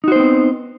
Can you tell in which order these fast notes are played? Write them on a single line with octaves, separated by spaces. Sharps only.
D#4 F#4 C5 B3 C4